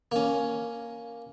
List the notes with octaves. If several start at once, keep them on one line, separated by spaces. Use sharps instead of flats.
A#3 C#4